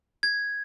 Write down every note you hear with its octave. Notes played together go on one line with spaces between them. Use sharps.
G#6